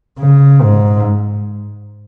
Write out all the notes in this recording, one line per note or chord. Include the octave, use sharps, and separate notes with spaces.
C#3
G#2